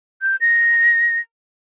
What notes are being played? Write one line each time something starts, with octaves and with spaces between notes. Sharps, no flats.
G6
A#6